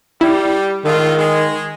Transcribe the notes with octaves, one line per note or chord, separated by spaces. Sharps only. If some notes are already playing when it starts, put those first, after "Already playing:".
G3 E4
A2 D#3 G#3 F4
G#3 G#4